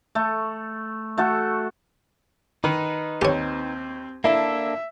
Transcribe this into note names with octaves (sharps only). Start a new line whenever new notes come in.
A3
A3 F#4 A4
D#3 D#4 B4
D#2 C4 G4 C#5
A#3 D4 E4 A4 E5